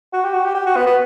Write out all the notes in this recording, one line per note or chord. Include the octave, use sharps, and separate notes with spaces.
F#4
G4
F#4
G4
G4
F#4
B3
B3